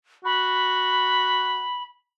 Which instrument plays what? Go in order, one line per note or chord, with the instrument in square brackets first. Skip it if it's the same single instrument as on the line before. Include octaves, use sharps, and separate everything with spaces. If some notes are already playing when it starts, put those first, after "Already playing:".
[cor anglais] F#4 [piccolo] B5